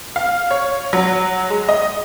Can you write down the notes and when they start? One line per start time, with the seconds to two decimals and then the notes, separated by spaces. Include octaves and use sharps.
0.16 F5
0.51 C#5
0.93 F#3
1.50 G#3
1.69 D#5